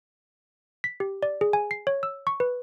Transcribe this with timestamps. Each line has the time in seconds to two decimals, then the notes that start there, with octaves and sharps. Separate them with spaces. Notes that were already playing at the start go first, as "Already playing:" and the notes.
0.84 B6
1.00 G4
1.23 D5
1.41 G#4
1.53 G#5
1.71 C7
1.87 C#5
2.03 E6
2.27 C#6
2.40 B4